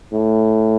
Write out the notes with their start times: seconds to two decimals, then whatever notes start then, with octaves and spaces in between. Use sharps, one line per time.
0.13 A2